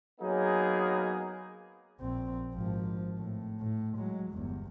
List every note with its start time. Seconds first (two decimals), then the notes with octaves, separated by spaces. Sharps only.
0.21 F#3 A#3 B3 D#4 G#4
2.00 A#1 C4
2.53 G#1 F3
3.18 A2
3.60 A2
3.97 F#3 G#3
4.31 G1 E2